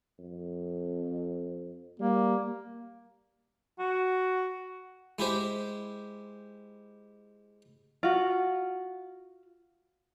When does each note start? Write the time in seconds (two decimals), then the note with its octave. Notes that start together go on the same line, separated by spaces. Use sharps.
0.19 F2
2.00 G3 A#3
3.79 F#4
5.19 G#3 E4 G4 C5
8.03 F4 F#4